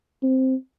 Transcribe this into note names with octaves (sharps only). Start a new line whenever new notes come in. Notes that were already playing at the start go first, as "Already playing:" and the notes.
C4